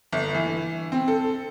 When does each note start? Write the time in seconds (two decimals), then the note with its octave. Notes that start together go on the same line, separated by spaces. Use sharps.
0.12 G1
0.35 E3
0.92 C4
1.08 A4